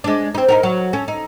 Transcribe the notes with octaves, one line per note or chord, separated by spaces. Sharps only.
G#3 D4
C4 D#4
D#4 F#4 A#4
F#3
C#4 A4
D#4